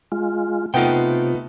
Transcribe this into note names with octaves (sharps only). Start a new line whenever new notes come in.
G#3 F4
C3 A3 B3 D#4 F4 G5